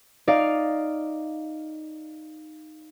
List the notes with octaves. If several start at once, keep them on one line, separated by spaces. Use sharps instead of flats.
D#4 D5 F5